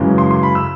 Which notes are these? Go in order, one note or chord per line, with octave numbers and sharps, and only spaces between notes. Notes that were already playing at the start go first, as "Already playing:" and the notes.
Already playing: F#2 C#3 E3 G#3
C6
C6
B5
E6